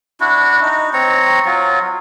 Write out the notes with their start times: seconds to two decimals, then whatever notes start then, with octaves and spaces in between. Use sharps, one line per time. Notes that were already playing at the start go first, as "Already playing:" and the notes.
0.20 D4 E4 F#4
0.62 D#4
0.93 C4 C#5 A#5
1.46 F#3 F4